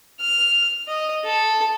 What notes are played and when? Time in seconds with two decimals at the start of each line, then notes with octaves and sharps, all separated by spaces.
0.21 F6
0.88 D#5
1.24 A4